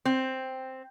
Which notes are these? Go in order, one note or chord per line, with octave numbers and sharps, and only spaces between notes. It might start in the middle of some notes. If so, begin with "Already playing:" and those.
C4